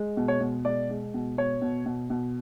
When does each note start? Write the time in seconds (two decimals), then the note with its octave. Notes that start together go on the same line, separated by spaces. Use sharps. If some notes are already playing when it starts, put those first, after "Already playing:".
Already playing: G#3
0.17 B2
0.28 C#5
0.40 B2
0.65 G#3 D5
0.90 G#3
1.14 B2
1.38 B2 C#5
1.62 B2
1.86 B2
2.10 B2